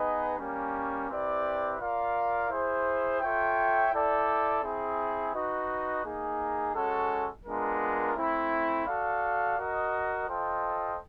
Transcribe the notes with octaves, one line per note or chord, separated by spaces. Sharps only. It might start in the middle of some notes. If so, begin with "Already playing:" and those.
Already playing: B3 D#4 G#4 B4 D#5
G3 A#3 C#4
C4 E4 G4 B4 D5
F4 A#4 D5 F5
E4 G#4 C5
F4 A4 C#5 E5 G5
E4 A4 D5 G5
C4 E4 G#4
D#4 F#4 B4 D#5
A#3 D#4 G#4
G#3 C#4 F#4 A4
G#3 B3 D4 F4 A#4
A3 C4 E4
F#4 A4 D5 F5
F#4 A#4 D#5
F4 A4 C5 D#5 G5